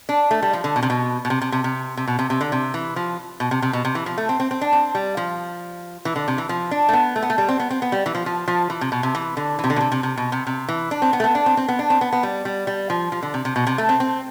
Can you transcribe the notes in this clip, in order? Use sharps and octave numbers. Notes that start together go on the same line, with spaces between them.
D4
A3
G3
F3
D3
B2
C3
B2
B2
C3
C3
C3
C3
C3
B2
C3
C3
D3
C3
E3
F3
B2
C3
C3
B2
C3
E3
F3
A3
C4
C4
C4
D4
C4
G3
F3
E3
D3
C3
E3
F3
D4
A3
B3
A3
B3
A3
G3
C4
B3
C4
B3
G3
E3
F3
F3
F3
E3
C3
B2
C3
E3
D3
E3
C3
D3
B2
C3
C3
C3
B2
C3
C3
E3
D4
C4
B3
A3
B3
D4
C4
C4
B3
D4
C4
B3
B3
G3
G3
G3
F3
F3
D3
C3
C3
B2
C3
A3
C4
C4